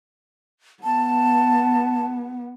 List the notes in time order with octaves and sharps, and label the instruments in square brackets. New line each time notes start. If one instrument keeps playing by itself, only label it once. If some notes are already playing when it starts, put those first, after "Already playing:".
[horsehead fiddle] B3 [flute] A5